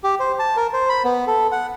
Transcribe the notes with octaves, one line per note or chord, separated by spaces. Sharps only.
G4
C5
A5
A#4
C5
B5
B3
A4
F#5